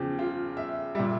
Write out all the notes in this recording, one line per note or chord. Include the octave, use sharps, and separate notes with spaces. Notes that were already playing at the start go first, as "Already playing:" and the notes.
Already playing: E2 C#3 F3 G4
F4
E5
A#2 G3 E5